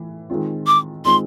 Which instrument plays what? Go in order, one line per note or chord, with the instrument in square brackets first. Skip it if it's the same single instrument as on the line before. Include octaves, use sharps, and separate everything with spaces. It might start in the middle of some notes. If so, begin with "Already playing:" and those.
Already playing: [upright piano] A2 E3
D#3 G#3 C4 F4
[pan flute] D6
[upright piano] D#3 G#3 C4 F4 [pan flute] C6